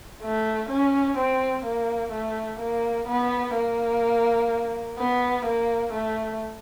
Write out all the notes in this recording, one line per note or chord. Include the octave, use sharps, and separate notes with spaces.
A3
C#4
C4
A#3
A3
A#3
B3
A#3
B3
A#3
A3